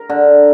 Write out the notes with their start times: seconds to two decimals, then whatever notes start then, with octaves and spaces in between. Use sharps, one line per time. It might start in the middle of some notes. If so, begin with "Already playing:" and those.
Already playing: A#4
0.10 D3